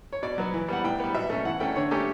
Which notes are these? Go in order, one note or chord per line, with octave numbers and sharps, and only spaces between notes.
C#5
B2 D5
F#3 B3
E3
G3 B3 F#5
A2 G5
G3 B3
B2 E5
A3 C#4
E3 F#5
A3 C#4 G5
D3 C#5
A3 C#4 G4